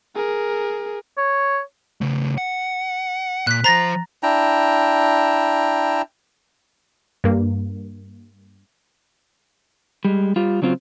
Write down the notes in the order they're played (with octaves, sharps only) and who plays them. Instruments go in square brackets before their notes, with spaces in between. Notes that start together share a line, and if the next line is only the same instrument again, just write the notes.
[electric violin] G#4 A#4
[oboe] C#5
[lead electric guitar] C#3 A3
F#5
[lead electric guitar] A#2 [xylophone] F#6 B6
[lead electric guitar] F3 C5 [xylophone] A#5 A6 A#6
[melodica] D4 E4 G5 A#5
[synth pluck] G2 A#3
[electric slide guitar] G3 G#3
G3 F4
C#3 F#3 C4 F4